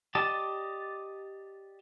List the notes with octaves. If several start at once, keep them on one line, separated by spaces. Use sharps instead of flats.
G4 D5 D#5 A5